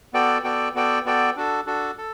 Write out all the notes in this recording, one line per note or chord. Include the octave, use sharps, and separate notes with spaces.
B3 F#4 A4 D5 G5
B3 F#4 A4 D5 G5
B3 F#4 A4 D5 G5
B3 F#4 A4 D5 G5
D4 F#4 A4
D4 F#4 A4
A4